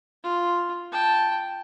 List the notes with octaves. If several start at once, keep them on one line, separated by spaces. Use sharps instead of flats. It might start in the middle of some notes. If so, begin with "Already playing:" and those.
F4
G5 A5